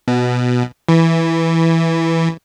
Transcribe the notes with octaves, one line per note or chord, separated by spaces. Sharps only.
B2
E3